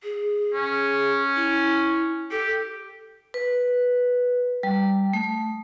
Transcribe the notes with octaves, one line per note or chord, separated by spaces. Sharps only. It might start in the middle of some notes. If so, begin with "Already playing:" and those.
G#4
C#4
E4
G4 A4
B4
G3
A3